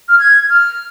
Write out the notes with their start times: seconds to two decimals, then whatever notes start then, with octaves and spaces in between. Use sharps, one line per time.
0.09 F6
0.18 G#6
0.49 F6